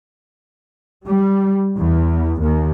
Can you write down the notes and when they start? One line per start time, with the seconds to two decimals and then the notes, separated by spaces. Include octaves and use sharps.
1.07 G3
1.78 E2
2.41 D#2